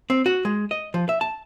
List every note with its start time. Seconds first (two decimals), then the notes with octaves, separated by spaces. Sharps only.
0.10 C4
0.26 F#4
0.45 G#3
0.71 D#5
0.94 F3
1.09 E5
1.21 A5